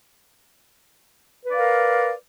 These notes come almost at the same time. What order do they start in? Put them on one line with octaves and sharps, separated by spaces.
B4 D5 F5 A#4